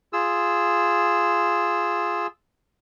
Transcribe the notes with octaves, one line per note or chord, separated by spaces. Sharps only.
F4 G#4 E6